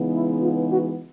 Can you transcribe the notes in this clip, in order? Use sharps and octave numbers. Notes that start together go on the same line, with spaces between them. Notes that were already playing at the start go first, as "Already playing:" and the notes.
Already playing: C#3 E3 G#3 B3 D#4
E4
F4
F#4